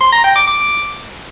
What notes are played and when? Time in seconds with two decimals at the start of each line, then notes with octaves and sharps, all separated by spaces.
0.01 C6
0.12 A#5
0.24 G5
0.36 D6
0.47 D6